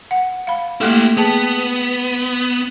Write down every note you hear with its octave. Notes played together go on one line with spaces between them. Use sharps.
F#5
F5 B5
A3 A#3 E4 G4 A4
B3 G#4 G5 A5